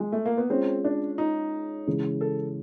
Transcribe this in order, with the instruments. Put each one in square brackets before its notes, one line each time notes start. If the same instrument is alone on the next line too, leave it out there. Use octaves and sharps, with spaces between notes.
[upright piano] G#3
A3
A#3
B3
[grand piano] G#3 C#4 F4 [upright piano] C4
[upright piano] D4
D#4
[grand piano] C#3 E3 G#3
[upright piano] A4